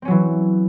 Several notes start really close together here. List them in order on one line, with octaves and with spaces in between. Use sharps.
C4 C#4 F#3 E3